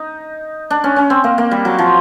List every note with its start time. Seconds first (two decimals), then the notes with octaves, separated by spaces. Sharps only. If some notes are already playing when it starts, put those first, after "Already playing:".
Already playing: D#4
0.70 D4
0.84 C#4
0.96 C#4
1.10 C4
1.24 A#3
1.38 A#3
1.51 G3
1.65 F#3
1.79 F3